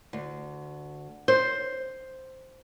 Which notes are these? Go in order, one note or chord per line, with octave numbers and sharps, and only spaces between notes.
D2
C5